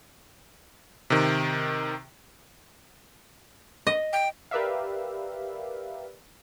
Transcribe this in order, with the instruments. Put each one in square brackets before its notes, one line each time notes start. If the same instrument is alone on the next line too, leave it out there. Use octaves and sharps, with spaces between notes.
[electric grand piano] C3 D#3
[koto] D#5
[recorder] G5
[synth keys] G4 A#4 B4 D5 E5 F5